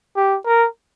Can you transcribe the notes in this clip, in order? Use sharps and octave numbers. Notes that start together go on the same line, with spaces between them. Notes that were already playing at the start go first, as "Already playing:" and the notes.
G4
A#4